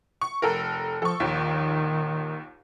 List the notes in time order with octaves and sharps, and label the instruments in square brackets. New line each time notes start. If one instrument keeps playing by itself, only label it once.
[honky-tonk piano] C#6
F1 A4 A#4
[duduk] F3 [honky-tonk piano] A4 C#6
[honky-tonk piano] A#1 D#2 [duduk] D#3